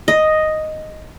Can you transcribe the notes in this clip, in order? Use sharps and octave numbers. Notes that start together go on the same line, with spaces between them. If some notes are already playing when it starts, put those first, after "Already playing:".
D#5